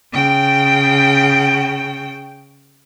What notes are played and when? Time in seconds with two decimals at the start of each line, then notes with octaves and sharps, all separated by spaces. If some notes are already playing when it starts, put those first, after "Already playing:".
0.12 C#3 G5